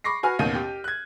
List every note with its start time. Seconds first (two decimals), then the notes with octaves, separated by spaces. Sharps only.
0.04 B5 C#6 D6 A#6 C7
0.23 F#4 B4 G#5 C#6 F6
0.39 A1 D#2 B2 G6 D#7
0.55 G4
0.84 F#6 G#6